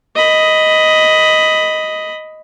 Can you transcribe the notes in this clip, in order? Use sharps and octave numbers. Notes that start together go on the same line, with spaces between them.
D#5 B5